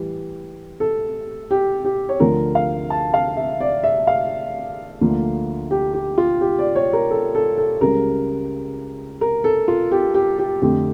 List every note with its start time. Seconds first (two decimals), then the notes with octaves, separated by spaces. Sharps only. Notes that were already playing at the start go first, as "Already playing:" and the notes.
Already playing: A2 E3 G3
0.80 A4
1.51 G4
1.85 G4
2.09 C#5
2.20 D2 D3 F3 A#4
2.55 F5
2.90 A5
3.14 F5
3.37 E5
3.60 D5
3.84 E5
4.07 F5
5.01 D2 D3 F3 A#3
5.71 G4
5.93 G4
6.18 F4
6.41 G4
6.59 D5
6.76 C#5
6.93 A#4
7.11 A4
7.35 A4
7.58 A4
7.81 C#2 C#3 G3 A#4
9.21 A#4
9.44 A4
9.68 F4
9.91 G4
10.14 G4
10.38 G4
10.62 F2 D3 A3 G4